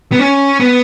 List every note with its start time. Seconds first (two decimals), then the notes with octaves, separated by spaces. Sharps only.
0.12 B3
0.19 C#4
0.60 B3